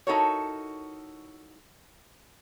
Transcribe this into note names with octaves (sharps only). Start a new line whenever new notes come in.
D#4 E4 F#4 A4 A#4 C#5